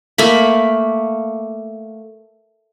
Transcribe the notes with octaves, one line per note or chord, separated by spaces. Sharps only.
A3 A#3 B5